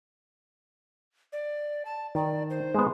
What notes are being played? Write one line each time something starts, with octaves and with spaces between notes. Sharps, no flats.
D5
A5
D#3 D5
C5
G#3 B3